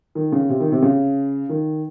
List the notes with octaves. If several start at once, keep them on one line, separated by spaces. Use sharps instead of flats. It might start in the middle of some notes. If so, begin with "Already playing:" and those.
D#3
C#3
C3
D#3
C3
C#3
D#3